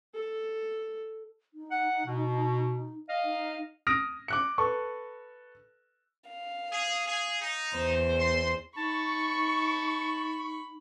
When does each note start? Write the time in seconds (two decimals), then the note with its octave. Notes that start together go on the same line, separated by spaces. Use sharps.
0.15 A4
1.54 D#4
1.71 F#5
2.06 B2
3.09 D#5 F5
3.24 D#4
3.87 D#6 F6 A#6 D7
4.28 D6 F#6 C#7
4.58 A4 B4 C#6
6.30 F5
6.72 G#4
7.07 G#4
7.42 D#4
7.75 E2 C5
8.20 C6
8.77 D#4 A5 B5 C#6